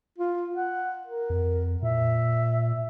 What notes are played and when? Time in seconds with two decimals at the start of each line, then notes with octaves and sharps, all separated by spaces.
0.18 F4
0.56 F#5
1.06 A#4
1.30 F2
1.82 A#2 E5